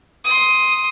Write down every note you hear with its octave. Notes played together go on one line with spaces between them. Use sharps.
C6 D#6